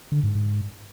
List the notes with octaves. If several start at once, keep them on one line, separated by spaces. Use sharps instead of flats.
D3
G#2
G#2